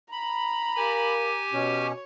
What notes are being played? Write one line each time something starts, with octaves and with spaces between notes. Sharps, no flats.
A#5 B5
G4 A#4 F5 G#5
B2 C#4 F#4 C#5